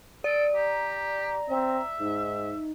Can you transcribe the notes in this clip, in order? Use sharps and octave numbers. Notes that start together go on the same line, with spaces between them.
A4 D5 D7
G4 A#5
C4 E5
G#2 D#4